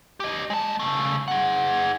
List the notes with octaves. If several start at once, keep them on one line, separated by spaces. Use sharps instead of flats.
G4 D#5
G#3 A5
C#3 A3
G#4 F#5